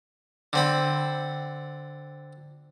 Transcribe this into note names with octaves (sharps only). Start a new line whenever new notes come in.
D3 C4 B5